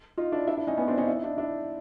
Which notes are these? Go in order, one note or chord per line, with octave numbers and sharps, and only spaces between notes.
D#4 F4
D4 E4
D4 E4
D4 E4
C#4 D#4
B3 C#4
C4 D4
C#4 D#4
E4
D#4
D4 E4
D4 E4